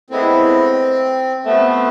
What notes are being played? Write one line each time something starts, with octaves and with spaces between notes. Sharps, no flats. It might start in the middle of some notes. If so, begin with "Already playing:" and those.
A2 G#3 B3 C4 E4
C3 F3 A3 B3